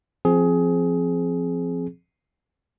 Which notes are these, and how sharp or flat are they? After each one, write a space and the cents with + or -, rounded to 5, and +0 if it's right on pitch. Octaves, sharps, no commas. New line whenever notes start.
F3 -10 C4 +0 G#4 +20